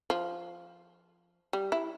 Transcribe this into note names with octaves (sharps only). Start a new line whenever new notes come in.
F3
G3
E4